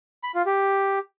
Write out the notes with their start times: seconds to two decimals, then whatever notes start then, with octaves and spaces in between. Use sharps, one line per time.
0.23 B5
0.35 F4
0.46 G4